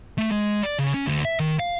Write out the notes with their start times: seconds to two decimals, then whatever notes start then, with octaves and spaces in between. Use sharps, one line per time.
0.18 A3
0.31 G#3
0.62 D5
0.79 C#3
0.94 C#4
1.06 D2
1.25 E5
1.40 D#3
1.59 F5